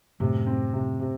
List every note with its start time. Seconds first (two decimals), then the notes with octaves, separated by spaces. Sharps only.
0.20 F#2 A2 C3
0.46 C4
0.73 C3
1.00 C3